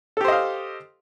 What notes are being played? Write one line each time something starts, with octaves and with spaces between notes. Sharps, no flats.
G4 A4 C5 D#5 F5